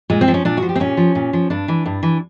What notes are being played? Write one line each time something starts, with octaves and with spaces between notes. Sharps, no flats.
A#2 G#3
C4
F3
C#4
A#2 D4
F3 F#4
G4
C4
A#2 C#4
F3
A#2
F3
G2 D4
E3
G2
E3